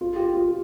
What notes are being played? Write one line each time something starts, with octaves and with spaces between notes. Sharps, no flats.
F4
G4
F4
F4